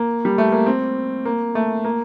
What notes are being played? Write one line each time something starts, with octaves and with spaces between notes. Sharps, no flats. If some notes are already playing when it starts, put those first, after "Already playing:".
Already playing: A#3
G3
A3
A#3
C4
A#3
A3
A#3